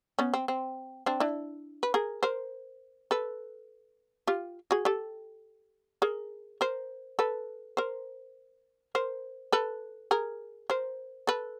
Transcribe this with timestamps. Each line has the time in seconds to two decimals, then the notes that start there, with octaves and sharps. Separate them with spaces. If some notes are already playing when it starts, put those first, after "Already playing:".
0.19 B3 C#4
0.34 C4
0.48 C4
1.06 C4 D4
1.20 D4 E4
1.83 B4
1.94 G#4 A#4
2.23 A#4 C5
3.11 A4 B4
4.27 F4 G4
4.71 F#4 G#4
4.85 G4 A4
6.02 G#4 A#4
6.61 A#4 C5
7.19 A4 B4
7.77 A#4 C5
8.95 A#4 C5
9.52 A4 B4
10.11 G#4 A#4
10.70 A#4 C5
11.27 A4 B4